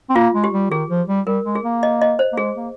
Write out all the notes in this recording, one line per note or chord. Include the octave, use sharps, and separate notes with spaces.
C4
A#3 F4
G#3
G4
G3
D#3 G#4
F3
G3
G3 A#4
G#3
G#4
A#3
D#5
D#5
C5
A#3
G#3 G#4
A#3